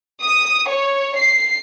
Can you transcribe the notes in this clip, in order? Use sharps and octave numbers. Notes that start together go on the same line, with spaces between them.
D#6
C#5
C7